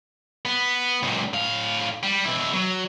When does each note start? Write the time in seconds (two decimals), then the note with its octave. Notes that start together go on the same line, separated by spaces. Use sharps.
0.45 B3
1.03 C#2 A#2
1.33 A2 F5
2.03 G3
2.25 B2 E4
2.53 F#3